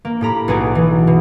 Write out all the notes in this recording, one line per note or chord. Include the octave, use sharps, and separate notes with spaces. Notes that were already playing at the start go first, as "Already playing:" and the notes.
A#3
A2 G4 A#5 B5
B1 F#4 G#4 D6
E3
B2